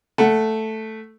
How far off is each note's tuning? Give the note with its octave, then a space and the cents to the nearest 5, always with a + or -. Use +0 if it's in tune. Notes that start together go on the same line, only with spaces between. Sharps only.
A3 +0 F#5 +0